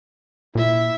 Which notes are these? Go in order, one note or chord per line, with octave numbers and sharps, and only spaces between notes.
A#2 E4 E5